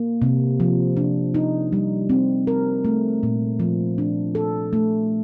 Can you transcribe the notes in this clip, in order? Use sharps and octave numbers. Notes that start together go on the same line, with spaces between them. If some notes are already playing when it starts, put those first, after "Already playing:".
Already playing: A#3
C3
F3
D4
D#4
G3
C4
A#4
A3
A#2
F3
D4
A4
A3